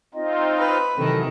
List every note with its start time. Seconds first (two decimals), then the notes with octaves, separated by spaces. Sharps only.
0.14 C4 D#4 F4 D#5
0.59 B4
0.97 C3 D#3 E3 F#3 A4